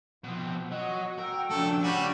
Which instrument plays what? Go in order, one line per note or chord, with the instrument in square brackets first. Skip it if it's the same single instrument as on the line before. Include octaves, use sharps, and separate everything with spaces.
[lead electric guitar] B2 C4 [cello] F3
[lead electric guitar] F#3 [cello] F#4 [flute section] D#5 C#6
[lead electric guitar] A#4 [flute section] G5 E6
[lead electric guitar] C#3 A3 [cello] F3 D4 [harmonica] A4
[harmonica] G3 F#4 [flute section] C#4 [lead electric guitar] D5 G#5